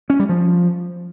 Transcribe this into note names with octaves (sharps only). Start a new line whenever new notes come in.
C#4
G3
F3